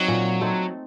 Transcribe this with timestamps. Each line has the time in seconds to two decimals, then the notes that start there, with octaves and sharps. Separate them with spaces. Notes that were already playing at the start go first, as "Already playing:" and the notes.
Already playing: F#3 C4 D#4
0.08 A#2
0.41 A3 C4 D#4